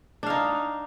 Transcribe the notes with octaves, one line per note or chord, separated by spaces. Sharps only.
D4 D#4 F5